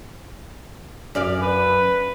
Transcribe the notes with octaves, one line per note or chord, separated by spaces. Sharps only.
F#2 D5 F5
B4